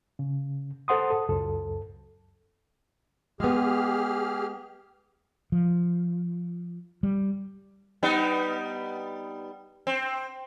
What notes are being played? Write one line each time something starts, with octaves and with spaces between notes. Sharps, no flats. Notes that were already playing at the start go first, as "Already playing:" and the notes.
C#3
A4 C5 F#5 C6 D#6
A4
C#2 F#2 A4
G#3 B3 G4 G#4 F6
F3
G3
G3 B3 D#4
C4